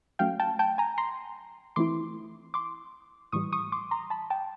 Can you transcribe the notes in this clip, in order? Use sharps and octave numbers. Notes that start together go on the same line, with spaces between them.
F#3 A3 C#4 F5 G5
G5 A5
G5 A5
G#5 A#5
A#5 C6
E3 A3 C4 E4 C6 D6
C6 D6
A2 E3 G3 C#6 D#6
C#6 D#6
C6 D6
A#5 C6
A5 B5
G5 A5